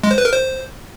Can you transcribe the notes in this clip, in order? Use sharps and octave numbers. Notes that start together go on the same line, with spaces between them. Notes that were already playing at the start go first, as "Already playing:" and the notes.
G#3
C5
B4
A#4
C5